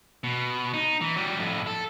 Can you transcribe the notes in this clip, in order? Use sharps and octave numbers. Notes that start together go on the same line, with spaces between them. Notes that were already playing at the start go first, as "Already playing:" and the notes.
B2
D#4
E3
F#3 G3
F2 A2
A4